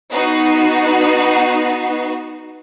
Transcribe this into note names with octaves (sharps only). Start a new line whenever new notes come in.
B3 D#4 F#4 C7